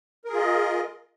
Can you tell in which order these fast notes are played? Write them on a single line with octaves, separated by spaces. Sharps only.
A#4 G#4 F4 D#5